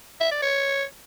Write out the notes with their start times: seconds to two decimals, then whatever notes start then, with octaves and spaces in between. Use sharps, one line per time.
0.20 E5
0.31 D5
0.42 C#5